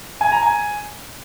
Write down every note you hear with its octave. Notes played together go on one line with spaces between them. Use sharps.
G#5
A#5
G#5